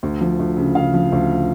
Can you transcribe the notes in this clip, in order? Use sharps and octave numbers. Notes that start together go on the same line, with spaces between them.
D2
F3
D2
C#3
C#3 F5
F3
D2